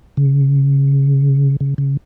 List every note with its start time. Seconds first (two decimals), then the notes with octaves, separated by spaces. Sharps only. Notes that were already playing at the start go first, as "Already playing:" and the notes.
0.17 C#3
1.60 C#3
1.78 C#3